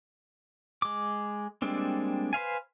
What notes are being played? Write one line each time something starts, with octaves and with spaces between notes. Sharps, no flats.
G#3 D6
G3 G#3 A#3 C4 D4
B4 C5 F5 G#5